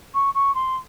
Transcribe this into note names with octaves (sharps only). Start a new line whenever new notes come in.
C#6
C#6
C6